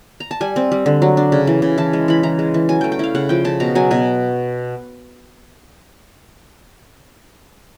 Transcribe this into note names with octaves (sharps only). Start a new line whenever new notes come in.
A#5
A5
G3 G#5
C4
G3
D3
F#3
D4
C#3
E3
C#3
E3 A5
G#3
E3 B5
E3 A#5
G#3
E3
F#3 G#5
A3 G5
G5
E4 F5
C#3 F#5
F3 G5
C#3 A5
B2 A#5
F#3 G#5
B2 G#5